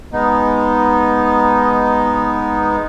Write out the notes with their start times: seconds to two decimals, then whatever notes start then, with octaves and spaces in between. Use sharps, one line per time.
0.13 G#3 B3 D#4